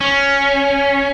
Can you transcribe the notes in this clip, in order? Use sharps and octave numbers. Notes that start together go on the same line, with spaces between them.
C#4